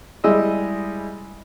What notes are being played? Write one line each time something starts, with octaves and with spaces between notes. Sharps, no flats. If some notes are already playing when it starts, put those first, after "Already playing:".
G3 G#3 E4 G#4 D#5 E6